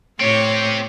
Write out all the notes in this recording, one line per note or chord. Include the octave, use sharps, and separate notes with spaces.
A2 C4 G4 C#5